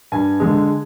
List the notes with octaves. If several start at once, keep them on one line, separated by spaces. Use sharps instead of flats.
G2 G#5
D3 G#3